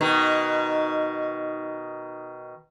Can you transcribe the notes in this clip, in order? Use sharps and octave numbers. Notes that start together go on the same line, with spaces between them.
B2 D#3